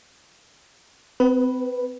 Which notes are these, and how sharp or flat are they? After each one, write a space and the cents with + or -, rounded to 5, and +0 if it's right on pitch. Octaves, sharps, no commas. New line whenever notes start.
C4 -35 B4 +0